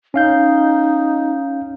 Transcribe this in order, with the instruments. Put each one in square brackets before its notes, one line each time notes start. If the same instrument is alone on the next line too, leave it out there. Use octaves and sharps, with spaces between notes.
[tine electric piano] C#4 F5 G6 [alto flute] D#4